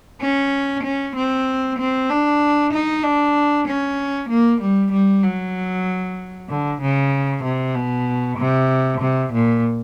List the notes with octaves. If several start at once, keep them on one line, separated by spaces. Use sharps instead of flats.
C#4
C#4
C4
C4
D4
D#4
D4
C#4
A#3
G3
G3
F#3
D3
C#3
C3
B2
C3
C3
A#2